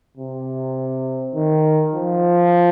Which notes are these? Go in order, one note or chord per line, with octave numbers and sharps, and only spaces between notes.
C3
D#3
F3